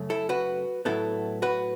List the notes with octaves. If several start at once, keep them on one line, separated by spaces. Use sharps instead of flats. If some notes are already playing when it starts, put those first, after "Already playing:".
Already playing: F#2 C#3 A3
E4 A4
F#4 B4
A2 F#3 B3 E4 A4
F#4 B4